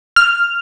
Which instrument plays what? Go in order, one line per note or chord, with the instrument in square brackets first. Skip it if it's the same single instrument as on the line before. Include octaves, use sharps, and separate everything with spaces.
[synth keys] F6